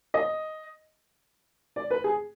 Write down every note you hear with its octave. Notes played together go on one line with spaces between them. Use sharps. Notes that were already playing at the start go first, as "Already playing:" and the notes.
D#5
D5
B4
G#4